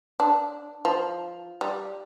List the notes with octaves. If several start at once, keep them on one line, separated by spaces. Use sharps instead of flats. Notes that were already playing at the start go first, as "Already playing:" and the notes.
D4
F3
G3